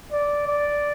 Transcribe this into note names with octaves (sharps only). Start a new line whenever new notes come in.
D5
D5